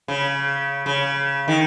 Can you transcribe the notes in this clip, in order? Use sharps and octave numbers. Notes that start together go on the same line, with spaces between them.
C#3
C#3
D#3